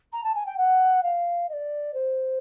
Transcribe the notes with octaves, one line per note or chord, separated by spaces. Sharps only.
A#5
A5
G#5
G5
F#5
F5
D#5
D5
C5